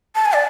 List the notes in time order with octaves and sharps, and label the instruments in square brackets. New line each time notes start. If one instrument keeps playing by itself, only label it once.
[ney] A5
G#5
D5